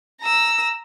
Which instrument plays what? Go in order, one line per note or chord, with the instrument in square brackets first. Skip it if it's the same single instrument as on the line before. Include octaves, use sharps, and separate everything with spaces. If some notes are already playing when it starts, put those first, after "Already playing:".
[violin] A#5 E6